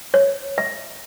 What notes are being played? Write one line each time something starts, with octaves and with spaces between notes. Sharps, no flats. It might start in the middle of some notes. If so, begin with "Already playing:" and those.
C#5
E5